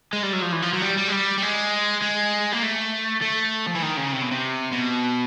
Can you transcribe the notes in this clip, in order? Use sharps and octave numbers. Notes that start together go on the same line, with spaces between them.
G#3
G3
F#3
F3
E3
F3
F#3
G3
G3
G#3
G3
G3
G#3
G#3
A#3
A3
A3
F3
E3
D#3
C#3
C3
B2
C3
B2